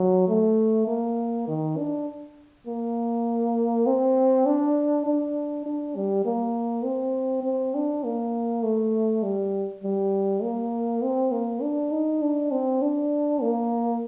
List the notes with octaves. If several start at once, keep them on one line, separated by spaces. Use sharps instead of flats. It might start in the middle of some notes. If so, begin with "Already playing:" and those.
Already playing: F#3
A3
A#3
D#3
D4
A#3
C4
D4
D4
D4
G3
A#3
C4
C4
D4
A#3
A3
G3
G3
A#3
C4
A#3
D4
D#4
D4
C4
D4
A#3